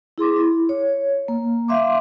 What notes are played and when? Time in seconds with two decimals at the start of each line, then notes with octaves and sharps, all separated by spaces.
0.18 E4 G#4 C6 D6
0.36 E4
0.69 C#5
1.28 A#3
1.68 E5 F5 C6 D6